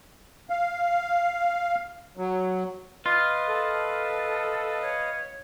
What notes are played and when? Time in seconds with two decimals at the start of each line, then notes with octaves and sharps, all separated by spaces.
0.50 F5
2.17 F#3
3.06 F4 B4 D#5 F5
3.47 A4
4.82 C#5